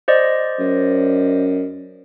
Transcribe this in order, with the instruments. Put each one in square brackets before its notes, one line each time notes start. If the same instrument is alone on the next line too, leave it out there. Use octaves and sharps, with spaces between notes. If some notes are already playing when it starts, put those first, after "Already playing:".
[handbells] C5 D5 D#5
[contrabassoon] F#2